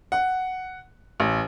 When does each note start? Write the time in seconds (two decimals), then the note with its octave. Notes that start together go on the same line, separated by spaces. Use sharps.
0.12 F#5
1.20 A1